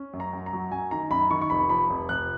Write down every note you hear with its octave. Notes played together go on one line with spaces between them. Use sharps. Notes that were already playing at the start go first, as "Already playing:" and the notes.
Already playing: C#4
F#2
A#5
F#2
A#5
F#3
F#2 G#5
D#3 A#5
F#2 B5
D#3 C#6
C#6
F1 B5
F3 B5
F1
F1 F#6